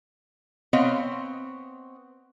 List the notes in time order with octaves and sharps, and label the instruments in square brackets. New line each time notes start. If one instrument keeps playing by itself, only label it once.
[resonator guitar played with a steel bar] B3 C4 C#5 D#5 F5